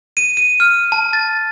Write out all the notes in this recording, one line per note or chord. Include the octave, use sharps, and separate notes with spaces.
D#7
D#7
F6
A5
A6